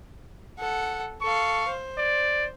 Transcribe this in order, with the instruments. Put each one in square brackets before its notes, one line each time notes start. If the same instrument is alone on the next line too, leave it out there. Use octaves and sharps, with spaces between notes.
[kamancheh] A4 F#5
[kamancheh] A4 F5 [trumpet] C#6
[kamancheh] C5
[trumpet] D5